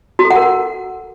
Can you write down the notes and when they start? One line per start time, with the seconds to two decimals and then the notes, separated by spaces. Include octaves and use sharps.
0.19 F#4
0.25 A4
0.31 F#5
0.36 A#4
0.42 F#5